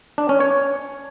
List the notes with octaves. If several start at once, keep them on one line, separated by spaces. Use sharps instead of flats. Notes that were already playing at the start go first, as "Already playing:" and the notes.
D4
C#4
C#5